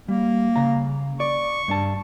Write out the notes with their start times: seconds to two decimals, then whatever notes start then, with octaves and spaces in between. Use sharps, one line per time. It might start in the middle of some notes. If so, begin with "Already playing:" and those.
0.08 G3 A#3
0.56 C#3 F5 A#5
1.20 D5 C#6
1.68 G2 D4 A5